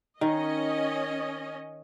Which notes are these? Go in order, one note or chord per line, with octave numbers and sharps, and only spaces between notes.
D#3 C#4 D#5